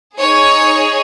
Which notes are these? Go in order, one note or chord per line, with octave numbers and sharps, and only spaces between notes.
D#4 G#4 C#5